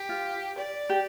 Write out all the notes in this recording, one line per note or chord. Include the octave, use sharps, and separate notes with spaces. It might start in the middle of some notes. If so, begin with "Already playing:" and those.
Already playing: G4
F4
D5
G4